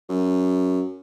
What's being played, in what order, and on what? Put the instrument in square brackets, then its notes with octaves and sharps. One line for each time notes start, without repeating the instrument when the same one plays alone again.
[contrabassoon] F#2